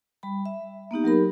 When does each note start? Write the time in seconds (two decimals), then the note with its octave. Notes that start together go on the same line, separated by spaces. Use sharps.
0.23 G3 B5
0.46 E5
0.91 A#3 B3 D#4 G4
1.04 F#3 G4 A#4 B5